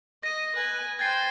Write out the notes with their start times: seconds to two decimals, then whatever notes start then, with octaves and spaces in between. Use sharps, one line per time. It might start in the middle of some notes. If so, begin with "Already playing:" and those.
0.23 D#5 A#6 D#7
0.55 B4 G#5
0.99 C5 G5 G#6 A6 C7